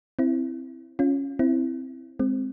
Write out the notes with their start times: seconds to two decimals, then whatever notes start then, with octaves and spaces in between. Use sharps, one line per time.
0.19 C4 E4
0.99 C#4 F4
1.39 C4 E4
2.19 G#3 C4